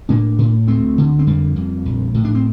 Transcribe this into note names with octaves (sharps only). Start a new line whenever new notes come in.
A2 A#3 D4
A2
D2 A3 C4
D3
C4
F2 G3 A#3
F2
A#1
A2
D4
C4